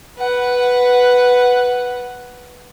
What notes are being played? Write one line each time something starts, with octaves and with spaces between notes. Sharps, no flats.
B4 F#5